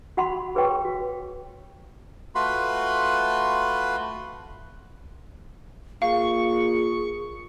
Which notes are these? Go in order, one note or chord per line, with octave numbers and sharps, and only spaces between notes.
F#4 F#5 B5 C6
G#4 B4 C#5 G5 C#6
F#4
A3 F4 F#4 B4 B5 C6
A#2 G#4 F5 C#6